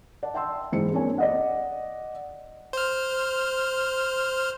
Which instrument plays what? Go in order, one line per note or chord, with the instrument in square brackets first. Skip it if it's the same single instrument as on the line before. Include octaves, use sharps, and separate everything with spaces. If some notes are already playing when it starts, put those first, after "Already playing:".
[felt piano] D5 F#5 A5
E5 G5 A5 C6 E6
F#1 G#2 E3 C5 C#7
G#3 A#3 C4 D4 C#5 G#5
[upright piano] D5 D#5 F#5
[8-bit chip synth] C5 F6